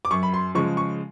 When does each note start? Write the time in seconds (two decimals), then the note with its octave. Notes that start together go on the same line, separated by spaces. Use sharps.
0.05 D6
0.11 F#2 C#6
0.23 B5
0.34 C6
0.55 C#3 F3 G#3 C#6
0.77 C#6